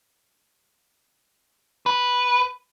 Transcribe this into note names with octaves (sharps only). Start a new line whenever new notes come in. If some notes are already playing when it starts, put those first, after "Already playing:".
B4